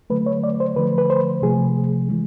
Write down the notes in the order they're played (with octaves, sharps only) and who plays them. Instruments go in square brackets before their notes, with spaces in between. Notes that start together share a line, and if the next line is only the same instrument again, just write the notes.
[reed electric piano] D3 F#3 A3 B4
C#5
D5
C5
D3 F3 A3 B4
B4
C5
C3 F3 A3 G#4
E3 G#3